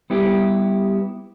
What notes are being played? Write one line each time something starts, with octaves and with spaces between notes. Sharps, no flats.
G3 B3 E4 G4